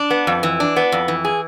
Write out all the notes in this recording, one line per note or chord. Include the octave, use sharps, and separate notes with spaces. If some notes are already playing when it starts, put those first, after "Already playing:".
Already playing: D4
B3
F2
E3
D4
B3
F2
E3
G#4